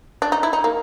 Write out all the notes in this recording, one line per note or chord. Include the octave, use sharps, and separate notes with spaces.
D4
D#4
E4
D#4
A#3